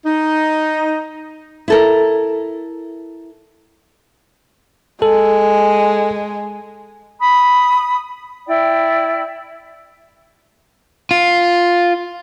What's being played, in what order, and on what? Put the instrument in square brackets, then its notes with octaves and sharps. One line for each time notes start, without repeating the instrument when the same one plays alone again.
[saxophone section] D#4
[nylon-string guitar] E4 A4 A#4
[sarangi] G#3 [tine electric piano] A4
[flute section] B5 D#6
E4 D5 G5
[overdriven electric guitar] F4